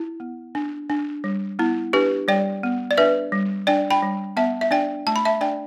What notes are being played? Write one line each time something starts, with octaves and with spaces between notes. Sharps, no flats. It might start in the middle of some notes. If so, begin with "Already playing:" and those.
Already playing: E4
B3
D4
D4
G3
B3 E4
D4 G4 B4
G3 D5 G5
B3
D5
D4 B4 E5
G3
D4 D5 G5
G5 B5
G3
B3 E5 A5
E5
D4 D5 G5
A3 A5
B5
E5 A5
D4 D5 G5